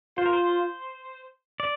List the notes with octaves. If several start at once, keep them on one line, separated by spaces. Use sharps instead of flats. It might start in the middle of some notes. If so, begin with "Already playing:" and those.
F4 C5
A#4
C5
D5